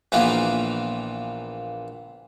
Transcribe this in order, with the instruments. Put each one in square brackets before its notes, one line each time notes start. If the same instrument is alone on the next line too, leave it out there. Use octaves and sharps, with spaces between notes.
[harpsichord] A#1 E3 A#3 B3 F4